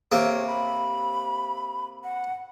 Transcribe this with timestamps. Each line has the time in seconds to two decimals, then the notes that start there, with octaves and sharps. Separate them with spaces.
0.12 C3 A#3 C#5
0.47 B5
2.04 F#5